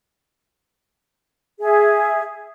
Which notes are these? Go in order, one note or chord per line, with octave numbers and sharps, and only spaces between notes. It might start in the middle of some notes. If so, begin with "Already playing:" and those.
G#4 E5